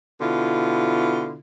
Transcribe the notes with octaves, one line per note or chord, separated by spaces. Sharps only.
B2 D3 E4 F4